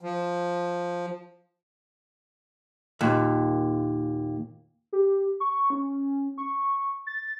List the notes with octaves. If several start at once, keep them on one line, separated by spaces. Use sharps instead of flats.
F3
D#2 A#2
G4
C#6
C#4
C#6
A6